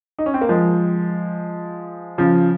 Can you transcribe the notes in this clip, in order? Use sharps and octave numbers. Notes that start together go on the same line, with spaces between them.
D#4
C#4
C4
A#3
F3 G#3
C#3 F3